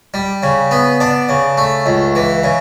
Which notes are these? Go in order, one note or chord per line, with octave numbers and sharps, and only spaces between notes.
G3
C#3
B3
D4
C#3
A3
C#2
E3
C#3